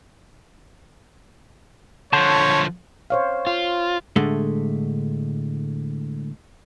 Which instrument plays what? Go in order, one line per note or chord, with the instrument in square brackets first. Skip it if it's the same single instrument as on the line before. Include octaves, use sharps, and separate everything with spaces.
[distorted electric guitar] D3 F3 [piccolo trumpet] C#5 [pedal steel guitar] A5 C6 G6
[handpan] C5 C#5 F5
[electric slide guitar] F4
[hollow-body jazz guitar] A2 D3 G#3 A3